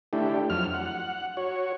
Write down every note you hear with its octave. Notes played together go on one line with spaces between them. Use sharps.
A3 D4 E4 G4
F2 F#3 F6
F#5
F#4 C#5